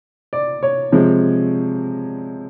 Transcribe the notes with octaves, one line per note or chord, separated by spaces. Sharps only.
D5
C#5
C3 F3 G#3